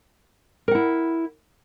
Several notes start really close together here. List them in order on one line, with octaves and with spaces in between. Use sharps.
A#4 F#5 E4